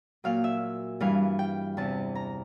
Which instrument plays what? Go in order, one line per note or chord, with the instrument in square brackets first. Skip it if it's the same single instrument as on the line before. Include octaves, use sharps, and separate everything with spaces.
[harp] A#2 F#3 F5
E5
G2 E3 G3 F5
G5
E2 C3 E3 A5
A#5